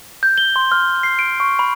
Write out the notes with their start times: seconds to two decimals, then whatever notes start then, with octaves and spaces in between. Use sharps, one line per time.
0.23 G6
0.38 G7
0.56 C6
0.72 F6
1.03 C7
1.19 D7
1.40 C#6
1.59 B5